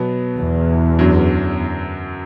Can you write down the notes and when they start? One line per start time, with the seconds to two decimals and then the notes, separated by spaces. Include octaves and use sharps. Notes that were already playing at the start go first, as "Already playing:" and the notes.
Already playing: B2 F#3 B3
0.39 E2
0.99 F#2 D3 F#3